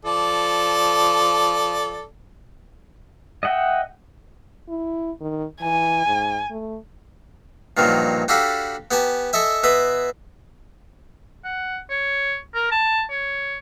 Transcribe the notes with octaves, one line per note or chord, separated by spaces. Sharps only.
F3 A4 D5
D#5 E5 F#5 G5
E4
D#3
E3 G#5
G#2
A3
G2 A#2 D#3 F3 F#3
D4 F#4 G4 A4 F5 B5
B3 G4 G#5 A5
A4 D#5 E5 G#5
B2 B4 E5 D#6
F#5
C#5
A#4
A5
C#5